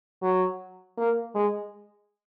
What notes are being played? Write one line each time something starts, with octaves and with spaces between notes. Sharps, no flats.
F#3
A#3
G#3